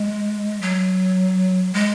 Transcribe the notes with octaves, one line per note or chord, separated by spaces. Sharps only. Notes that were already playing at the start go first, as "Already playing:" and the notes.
Already playing: G#3
F#3
G#3